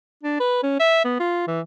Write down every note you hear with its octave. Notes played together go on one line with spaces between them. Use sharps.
D4
B4
C#4
E5
B3
F4
E3